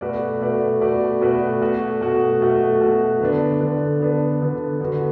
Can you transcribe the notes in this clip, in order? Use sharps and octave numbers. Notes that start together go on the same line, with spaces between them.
B2 A3 F#4 B4 D5
B2 A3 F#4 B4 D5
B2 A3 F#4 B4 D5
B2 A3 F#4 B4 D5
B2 A3 F#4
B2 A3 F#4
B2 A3 F#4
B2 A3 F#4
D3 B3 D4
D3 B3 D4
D3 B3 D4
D3 B3 D4
D3 B3 F#4